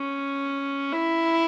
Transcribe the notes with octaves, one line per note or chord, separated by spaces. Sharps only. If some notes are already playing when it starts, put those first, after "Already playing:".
Already playing: C#4
E4